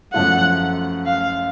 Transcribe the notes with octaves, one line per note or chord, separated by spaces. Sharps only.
F#2 F3 A3 F4 F#5
F5